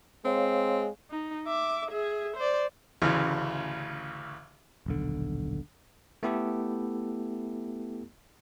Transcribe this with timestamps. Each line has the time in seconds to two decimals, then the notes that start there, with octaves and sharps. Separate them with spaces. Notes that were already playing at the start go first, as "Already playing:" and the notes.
0.25 G#3 C4 C#5 F5
1.10 D#4
1.47 E5 D6
1.91 G#4 E5
2.37 C5 D5
3.02 A1 D2 C#3 E3
4.86 D#1 B1 D3
6.23 A3 B3 E4 G4 A4